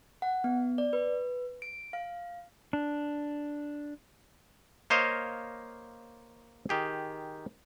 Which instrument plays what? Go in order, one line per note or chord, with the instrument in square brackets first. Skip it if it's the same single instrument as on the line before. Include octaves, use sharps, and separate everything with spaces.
[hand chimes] F#5
B3
D5
B4
D7
F5
[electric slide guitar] D4
[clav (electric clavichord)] A#3 C5 C#5 D#5 F5
D#3 G4 G#4